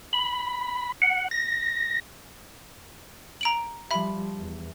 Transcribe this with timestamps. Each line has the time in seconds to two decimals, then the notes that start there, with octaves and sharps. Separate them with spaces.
0.13 B5
1.02 F#5
1.31 A#6
3.41 A#5 D7 F#7
3.91 F3 G3 E5 B5
4.39 E2